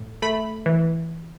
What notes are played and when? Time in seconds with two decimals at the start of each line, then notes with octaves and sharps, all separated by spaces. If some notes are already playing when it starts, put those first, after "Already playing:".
Already playing: A2
0.22 A3 B5
0.66 E3